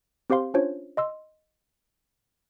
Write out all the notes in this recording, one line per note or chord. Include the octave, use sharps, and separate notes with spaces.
C4 G4 C5 F5 C6
C#4 D4 F4 C5 C#5
D#5 C6 E6